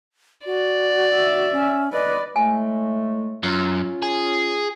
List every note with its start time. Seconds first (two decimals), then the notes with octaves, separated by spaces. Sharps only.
0.46 F#4 D5
1.14 E5
1.52 C#4
1.92 B4 D5 D#5
2.36 A2 G#3 A3 G#5
3.43 F#2 C#4 F4
4.02 G#4